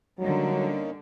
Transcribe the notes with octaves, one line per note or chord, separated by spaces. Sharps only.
D3 F#3 G3 A#3 C#4 D#4